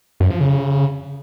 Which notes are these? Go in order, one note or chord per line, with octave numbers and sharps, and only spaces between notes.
F#2
F3
C#3